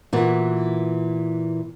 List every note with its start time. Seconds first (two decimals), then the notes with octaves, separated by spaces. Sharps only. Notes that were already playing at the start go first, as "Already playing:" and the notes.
0.13 A#2 E3 F#4